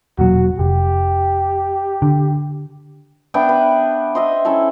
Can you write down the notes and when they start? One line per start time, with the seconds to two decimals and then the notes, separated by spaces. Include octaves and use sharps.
0.19 E1 A#2 F#3 F#4
0.59 F1 G4
2.02 D3
3.34 B3 D4 E5 G5
3.49 B4
4.15 C5 D#5 E5
4.45 C#4 E4 A4 C5